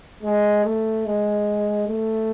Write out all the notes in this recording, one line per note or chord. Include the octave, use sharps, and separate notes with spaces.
G#3
A3
G#3
A3